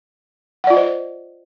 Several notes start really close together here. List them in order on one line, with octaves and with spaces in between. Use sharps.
F#5 D5 F4 D#5 C5